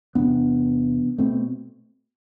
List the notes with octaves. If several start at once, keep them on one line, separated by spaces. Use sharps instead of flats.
E2 C3 B3 D4
B2 A3 C4